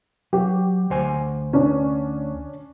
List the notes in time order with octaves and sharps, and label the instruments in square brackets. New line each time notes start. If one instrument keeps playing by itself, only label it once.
[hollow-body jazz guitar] F#3 [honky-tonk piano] G4
[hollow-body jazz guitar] D2 C5 G#5
[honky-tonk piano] C#4 D4